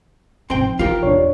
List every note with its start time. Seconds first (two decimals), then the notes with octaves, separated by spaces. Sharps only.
0.50 G#2 F3 C4 C5 G5
0.79 D#3 F4 G4 A#4
1.03 A1 E2 D4 C#5